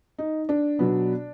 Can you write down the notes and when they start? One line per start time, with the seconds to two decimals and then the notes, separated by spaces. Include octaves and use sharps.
0.18 D#4
0.49 D4
0.79 B2 F#3 B3